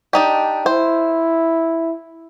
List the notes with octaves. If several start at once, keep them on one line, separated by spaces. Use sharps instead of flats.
D4 D#4 G4
E4 C5